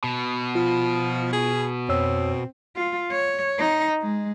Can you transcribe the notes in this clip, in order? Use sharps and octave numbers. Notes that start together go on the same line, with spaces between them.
B2
F3 F4
G#4
F2 C4 C#5 E6
F4
C#5
D#4
G#3